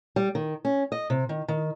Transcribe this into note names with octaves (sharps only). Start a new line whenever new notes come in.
G3
D#3
C#4
D#5
C3
D#3
D#3